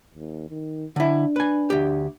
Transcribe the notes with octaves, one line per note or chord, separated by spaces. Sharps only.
D#2
D#3
D3 D4 E4
B4 G#5
D2 G4